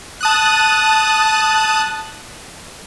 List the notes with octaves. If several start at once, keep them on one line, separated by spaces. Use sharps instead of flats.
A5 D#6 F#6